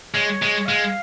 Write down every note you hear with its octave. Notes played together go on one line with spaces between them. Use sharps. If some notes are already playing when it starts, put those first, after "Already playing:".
G#3 C#5
G#3
G#3 F5